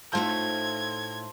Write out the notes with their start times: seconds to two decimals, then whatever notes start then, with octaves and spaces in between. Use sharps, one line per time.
0.13 A2 A3 D#4 F4 C5 A5 G#6